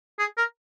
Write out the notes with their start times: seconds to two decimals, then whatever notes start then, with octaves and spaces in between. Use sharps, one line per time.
0.19 G#4
0.37 A#4